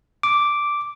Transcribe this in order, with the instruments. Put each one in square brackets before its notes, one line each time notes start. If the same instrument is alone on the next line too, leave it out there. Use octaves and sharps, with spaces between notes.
[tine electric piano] D6